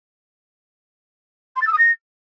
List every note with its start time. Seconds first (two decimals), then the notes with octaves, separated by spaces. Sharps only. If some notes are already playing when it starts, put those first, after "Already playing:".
1.56 C6
1.61 A6
1.67 E6
1.72 D#6
1.78 A#6